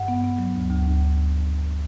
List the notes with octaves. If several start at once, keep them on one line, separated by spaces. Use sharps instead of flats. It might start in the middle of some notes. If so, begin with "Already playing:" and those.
Already playing: G2 F#5
B3
B3
F#3
D2
D2
D2